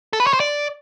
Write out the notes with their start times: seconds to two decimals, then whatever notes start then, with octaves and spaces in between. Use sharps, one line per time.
0.13 A4
0.20 B4
0.27 C#5
0.33 C5
0.40 D5